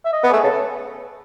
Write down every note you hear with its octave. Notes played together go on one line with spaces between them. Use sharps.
E5
D#5
B3
A3 G#4
C#3 A4